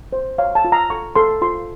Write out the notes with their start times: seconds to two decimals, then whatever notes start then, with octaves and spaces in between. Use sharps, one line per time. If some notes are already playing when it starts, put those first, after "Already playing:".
0.13 C5
0.38 C#5 F5
0.55 A5
0.65 F4
0.72 A#5
0.90 A4 C#6
1.16 A4 C6
1.42 F4 C6